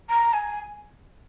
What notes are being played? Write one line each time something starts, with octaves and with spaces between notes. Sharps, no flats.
A#5
G#5